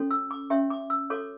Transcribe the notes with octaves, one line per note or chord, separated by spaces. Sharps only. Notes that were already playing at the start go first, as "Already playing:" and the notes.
Already playing: C#4 F#4 A4 C#5
E6
D6
C#4 G4 C#5 E5
D6
E6
F#4 A4 C#5 D6